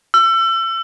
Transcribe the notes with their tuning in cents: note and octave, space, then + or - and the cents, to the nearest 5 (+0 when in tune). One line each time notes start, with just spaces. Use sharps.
E6 +30